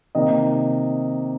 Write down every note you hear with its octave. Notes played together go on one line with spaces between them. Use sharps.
C3 D#3 A#3 D#5